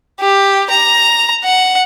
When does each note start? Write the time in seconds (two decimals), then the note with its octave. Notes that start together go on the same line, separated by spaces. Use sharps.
0.20 G4
0.70 A#5
1.44 F#5